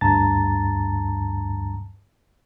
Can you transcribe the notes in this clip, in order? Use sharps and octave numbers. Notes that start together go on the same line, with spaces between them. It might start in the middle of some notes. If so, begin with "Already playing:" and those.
D2 G2 A5 A#5 A6